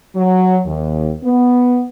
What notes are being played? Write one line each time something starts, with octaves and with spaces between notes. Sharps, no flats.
F#3
D#2
B3